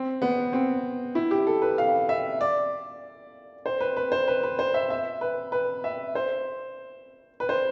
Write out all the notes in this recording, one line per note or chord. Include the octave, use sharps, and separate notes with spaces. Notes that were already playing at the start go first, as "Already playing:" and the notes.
Already playing: C4
B3
C4
E4
G4
A4
B4
F5
E5
D5
C5
B4
B4
C5
B4
B4
C5
E5
E5
B4
B4
E5
C5
B4
C5